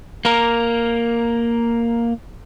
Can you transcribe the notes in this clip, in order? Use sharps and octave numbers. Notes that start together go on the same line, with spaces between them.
A#3 A#4